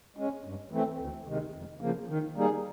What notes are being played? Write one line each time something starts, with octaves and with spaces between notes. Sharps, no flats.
G#3 C#4
G2
E3 A3 C4
D2
C3 D#3 G#3
F2
C#3 F3 A#3
D#3
G3 A#3 D#4 G#4